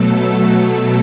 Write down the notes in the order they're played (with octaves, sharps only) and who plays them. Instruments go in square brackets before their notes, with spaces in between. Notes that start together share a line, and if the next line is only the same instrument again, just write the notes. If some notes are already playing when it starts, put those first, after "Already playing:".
Already playing: [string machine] B2 F#3 A3 A4